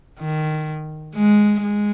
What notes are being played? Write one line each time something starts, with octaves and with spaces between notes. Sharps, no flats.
D#3
G#3
G#3